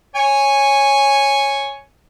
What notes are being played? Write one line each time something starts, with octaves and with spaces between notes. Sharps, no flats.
C#5 G#5